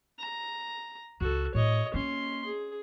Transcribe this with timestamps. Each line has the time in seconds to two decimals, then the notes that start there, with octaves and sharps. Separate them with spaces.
0.19 A#5
1.21 C#2 F#4 A4
1.54 A2 C#5 D#5
1.94 A#3 C#4 C6
2.45 G#4